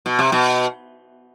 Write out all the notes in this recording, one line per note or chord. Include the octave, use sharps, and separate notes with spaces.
B2
C3
B2